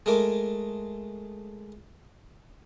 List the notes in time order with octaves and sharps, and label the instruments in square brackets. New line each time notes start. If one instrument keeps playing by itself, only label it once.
[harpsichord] G#3 A3 A#4 D6